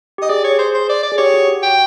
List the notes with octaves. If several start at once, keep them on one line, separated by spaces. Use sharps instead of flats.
G4 D#5
G#4 D5
C#5
G#4
C5
C5
D5
D5
G#4
G4 C#5
F#4
F#4
G5